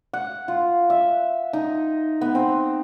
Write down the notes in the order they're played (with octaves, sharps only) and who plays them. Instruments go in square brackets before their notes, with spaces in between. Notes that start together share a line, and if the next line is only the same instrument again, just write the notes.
[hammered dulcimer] F#5
F4
E5
D#4
B3
C4